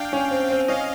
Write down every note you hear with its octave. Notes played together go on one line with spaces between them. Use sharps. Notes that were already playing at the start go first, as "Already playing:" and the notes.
Already playing: D4 F5 G5
C#4
C4
C4
C#4 D#5 F5